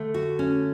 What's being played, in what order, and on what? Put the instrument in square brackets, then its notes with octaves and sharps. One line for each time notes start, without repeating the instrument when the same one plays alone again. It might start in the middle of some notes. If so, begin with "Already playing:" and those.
Already playing: [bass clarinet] D3 [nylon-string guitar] A3
[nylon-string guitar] F#4
C#4